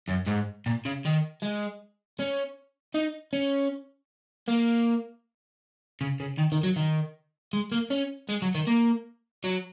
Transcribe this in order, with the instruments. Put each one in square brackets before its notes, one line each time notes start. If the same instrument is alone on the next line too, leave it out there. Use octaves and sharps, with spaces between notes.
[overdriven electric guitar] F#2
G#2
A#2
C#3
D#3
G#3
C#4
D#4
C#4
A#3
C#3
C#3
D#3
D#3
F#3
D#3
G#3
A#3
C#4
G#3
F#3
D#3
A#3
F#3